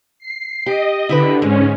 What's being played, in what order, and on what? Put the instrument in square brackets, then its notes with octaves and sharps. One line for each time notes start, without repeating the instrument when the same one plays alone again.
[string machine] C7
[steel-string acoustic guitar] G4 [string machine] D#5
[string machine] D3 [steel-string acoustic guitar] E4 G4 B4
[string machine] G#2 C#4 [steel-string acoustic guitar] G#3